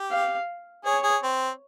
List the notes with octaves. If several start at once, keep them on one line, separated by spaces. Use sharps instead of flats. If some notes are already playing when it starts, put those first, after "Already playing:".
Already playing: G4
F5
G#4 C#5
G#4
C4